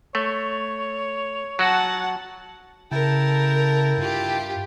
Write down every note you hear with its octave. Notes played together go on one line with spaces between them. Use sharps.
A3 C#5
F#3 F#4 F#5 A5
C#3 E4 A4 A#4 G5 A5
G2 F4 G4